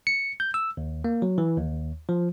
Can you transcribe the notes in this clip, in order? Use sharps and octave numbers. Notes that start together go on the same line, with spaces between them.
C#7
G6
E6
D#2
A#3
F#3
E3
D#2
F3